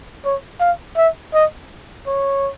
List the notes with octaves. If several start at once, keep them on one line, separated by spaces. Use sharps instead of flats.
C#5
F5
E5
D#5
C#5